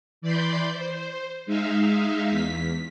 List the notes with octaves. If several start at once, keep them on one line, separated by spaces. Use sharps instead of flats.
E3 D5 B5 C6 G6
C5
G#3 D#4 E5 F5
E2 B6